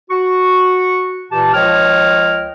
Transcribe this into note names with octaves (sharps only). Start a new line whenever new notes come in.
F#4 C#6
A#2 E3 G4 A5
C#2 F3 C#5 D#5 G5 F6